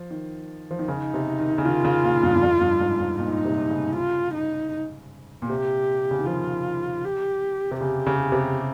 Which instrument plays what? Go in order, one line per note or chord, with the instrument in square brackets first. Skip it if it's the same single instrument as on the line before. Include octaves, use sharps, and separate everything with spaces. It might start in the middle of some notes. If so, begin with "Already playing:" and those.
Already playing: [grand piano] F3
D#3
F3
D#3
[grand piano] C#3 [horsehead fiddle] D#4
[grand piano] C3
D#3
C#3
[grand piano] D#3 [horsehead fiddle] F4
[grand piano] C#3
A#2
G2
G2
F2
G2
G#2
G#2
[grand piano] A#2 [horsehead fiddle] D#4
[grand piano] C3
C#3
[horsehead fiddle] F4
D#4
[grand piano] A#2
[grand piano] C3 [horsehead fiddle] G4
[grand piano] C#3
D#3
[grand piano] F3 [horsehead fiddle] F4
[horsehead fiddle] G4
[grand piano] C3
[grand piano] C#3 [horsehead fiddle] G4
[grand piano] C#3
C3